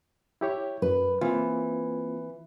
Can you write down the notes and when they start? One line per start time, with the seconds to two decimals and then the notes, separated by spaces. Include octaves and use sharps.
0.41 E4 G4 C#5
0.82 F#2 B4
1.21 E3 A#3 C4 F4